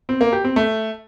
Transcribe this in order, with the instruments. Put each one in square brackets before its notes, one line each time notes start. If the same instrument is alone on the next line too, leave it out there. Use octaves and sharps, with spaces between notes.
[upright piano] C4
A#3
G4
C4
A3